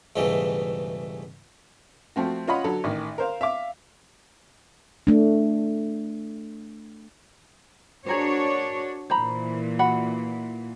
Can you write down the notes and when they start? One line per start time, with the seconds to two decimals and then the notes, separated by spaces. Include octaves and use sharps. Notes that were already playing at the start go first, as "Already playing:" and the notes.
0.16 C#2 G#2 B2 E3 G3 A3
2.16 F3 A3 C4 F#4
2.48 C#4 F4 D#5 F#5 B5
2.64 D3 F#3 A4
2.84 A1 D#3
3.18 A#4 C5 F5
3.41 E5 F5 D6
5.07 A3 D4
8.06 D4 F#4 G#4 A#4 C5 C#5
9.10 A#2 E3 C5 A#5 B5
9.79 F#4 F#5 B5